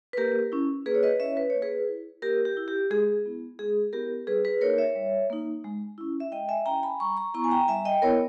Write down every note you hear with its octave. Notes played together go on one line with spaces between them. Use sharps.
B4
A#3 G4 A#4
C#4 E4
A#3 G#4 B4
C#5
B4 D#5
C#4 E4 C#5 E5
B4
A#3 C#5
G#4 B4
E4
A#3 G4 A#4
G4
E4
G4
G#3 G#4
B3 E4
G#3 G#4
B3 E4 G4 A#4
G3 G#4 B4
G#4 B4
A#3 D#4 A#4 C#5
C#5 E5
G3
A#3 D#4
G#3
C#4 E4
E5
G#3 D#5 G5
E5 G#5
C#4 E4 G5 A#5
G#5 B5
G3 A#5 C#6
A#5 C#6
B3 E4 A#5 C#6
G#5
G5 A#5
G3 E5 G#5
D#5 G5
B3 E4 A#4 C#5